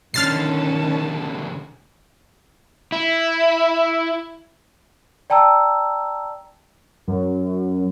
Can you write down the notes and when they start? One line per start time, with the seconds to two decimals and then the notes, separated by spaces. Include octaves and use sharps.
0.14 B1 D3 D#3 C#4 A5 F6 A6 C7
2.92 E4
5.30 D5 G5 A5 A#5 E6
7.08 F#2